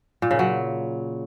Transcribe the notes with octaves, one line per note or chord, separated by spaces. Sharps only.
A#2
C#3
F#3